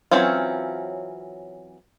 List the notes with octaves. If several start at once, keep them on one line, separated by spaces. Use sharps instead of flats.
E3 F#3 C4 C#4 F4